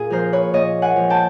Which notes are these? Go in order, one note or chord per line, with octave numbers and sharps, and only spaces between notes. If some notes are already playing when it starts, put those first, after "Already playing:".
Already playing: A#2 G#4
F3 A#4 C5
B4 C#5
A#2 C#5 D#5
F#5 G#5
F3
G5 A5